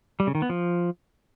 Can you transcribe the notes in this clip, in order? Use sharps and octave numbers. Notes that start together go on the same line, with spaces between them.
G3
C#3
D#3
B3
F3